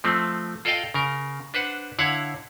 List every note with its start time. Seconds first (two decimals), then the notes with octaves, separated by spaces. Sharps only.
0.04 F3 A3 C4
0.65 F4 A4 D5 D#5 F5 G5
0.94 C#3 A#4
1.54 D4 B4 C5 F#5
1.99 D3 E4 C#5 F5 F#5